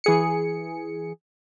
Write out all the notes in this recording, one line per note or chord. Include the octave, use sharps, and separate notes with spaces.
E3 G#4 C#7